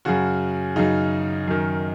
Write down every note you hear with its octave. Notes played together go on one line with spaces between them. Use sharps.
F#2 C#3 F#4
F#2 C#3 D#4
F#2 D#3